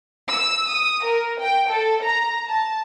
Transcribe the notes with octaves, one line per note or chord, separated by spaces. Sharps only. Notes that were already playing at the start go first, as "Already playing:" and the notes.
E6
D#6
A#4
G5
A4
A#5
A5